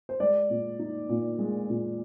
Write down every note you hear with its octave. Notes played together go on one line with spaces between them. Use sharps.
C5
G#3 D5
A#2
D#4
A#2
G#3
A#2